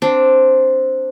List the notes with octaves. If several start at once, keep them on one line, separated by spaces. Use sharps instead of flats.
C4 D4